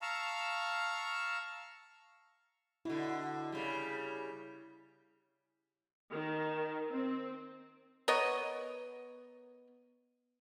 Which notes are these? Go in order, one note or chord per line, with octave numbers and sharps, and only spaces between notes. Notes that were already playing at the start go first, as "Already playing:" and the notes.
F5 A5 A#5 C#6 E6 F6
B2 D3 E4
C#3 G3
D#3
C4
B3 A#4 C#5 D#5